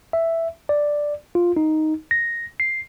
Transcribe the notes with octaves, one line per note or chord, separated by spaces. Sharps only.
E5
D5
F4
D#4
A#6
C7